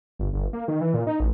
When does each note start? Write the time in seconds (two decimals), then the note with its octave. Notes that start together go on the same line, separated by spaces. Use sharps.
0.19 G1
0.33 G1
0.53 A#3
0.68 D#3
0.81 E3
0.94 A#2
1.07 D#4
1.20 A1